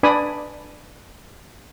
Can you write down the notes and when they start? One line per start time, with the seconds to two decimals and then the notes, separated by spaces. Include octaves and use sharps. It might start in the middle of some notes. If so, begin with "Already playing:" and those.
0.03 D4 B4 D5 G#5 B5 D#6